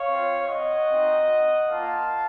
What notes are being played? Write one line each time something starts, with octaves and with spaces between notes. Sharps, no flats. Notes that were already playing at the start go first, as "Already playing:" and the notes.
Already playing: C#5 F5
C4 F4
D#5 F#5
C4 D#4 F#4
A#3 F4 F5 A5